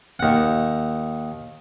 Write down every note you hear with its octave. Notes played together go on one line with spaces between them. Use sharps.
D#2 F#5